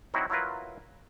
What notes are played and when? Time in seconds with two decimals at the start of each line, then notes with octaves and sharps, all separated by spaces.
0.14 F#3 C4 D#4 E4 F#4
0.30 F#3 E4 F4 A#4 B4